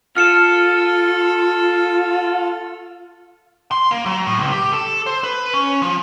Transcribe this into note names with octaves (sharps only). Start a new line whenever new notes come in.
F4 A4 F6 C#7 E7
C6
A#3
F#3
A2
C#2
G4
A4
C5
B4
C#4
F3